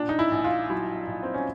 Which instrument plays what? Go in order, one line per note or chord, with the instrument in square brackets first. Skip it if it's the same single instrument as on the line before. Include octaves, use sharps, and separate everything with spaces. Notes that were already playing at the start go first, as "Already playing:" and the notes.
Already playing: [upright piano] A#2 D4
D#4
E4
A#1
F4
F#3 E4
A#1
C4
C#4